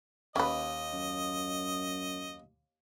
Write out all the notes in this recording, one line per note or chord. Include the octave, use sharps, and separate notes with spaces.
D#2 C#4 B4 D#5
F#2